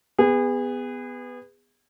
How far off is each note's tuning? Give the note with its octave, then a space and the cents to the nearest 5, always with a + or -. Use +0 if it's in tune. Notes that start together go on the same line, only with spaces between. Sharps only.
B3 +10 G#4 -30